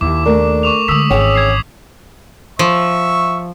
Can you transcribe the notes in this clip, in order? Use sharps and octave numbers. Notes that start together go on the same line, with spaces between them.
D#2 E4 D6
A3 D4 A#4
C#6 D6 F7
D3 G#3 D#6 E6 B6
G#1 E3 C#4 G#4 G5
G#6 C7
F3 E5 C#6